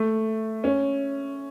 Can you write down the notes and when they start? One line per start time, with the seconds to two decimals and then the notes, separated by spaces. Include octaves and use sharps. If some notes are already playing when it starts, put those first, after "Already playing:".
Already playing: A3
0.64 C#4